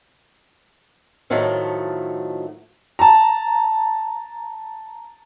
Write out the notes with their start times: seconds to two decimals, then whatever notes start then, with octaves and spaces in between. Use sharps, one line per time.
1.30 A2 D#3 F3 F#3 A3
2.99 A5 A#5